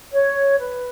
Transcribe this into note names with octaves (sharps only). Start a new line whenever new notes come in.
C#5
B4